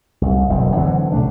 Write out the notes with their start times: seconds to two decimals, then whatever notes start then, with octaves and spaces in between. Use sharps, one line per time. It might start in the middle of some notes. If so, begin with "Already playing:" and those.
0.21 C2
0.49 F#1 B1 E2 A#2
0.76 D3 E3 F#3 C4
1.12 A#1 C3 A3 D4